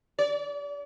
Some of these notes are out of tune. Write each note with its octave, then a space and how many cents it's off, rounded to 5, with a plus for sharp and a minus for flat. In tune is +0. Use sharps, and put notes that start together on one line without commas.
D5 -35